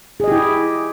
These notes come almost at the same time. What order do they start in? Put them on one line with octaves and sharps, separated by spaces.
G#4 D#5 G4 E4